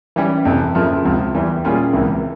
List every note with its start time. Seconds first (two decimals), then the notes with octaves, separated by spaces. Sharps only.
0.16 E3 G3 C#4
0.45 F2 C3 E3
0.75 F2 C#3 F3 A#3 E4
1.05 C#2 C3 F3
1.35 E2 E3 G3
1.64 A#2 G3 C#4 F4 G#4
1.93 C#2 C3 E3 A#3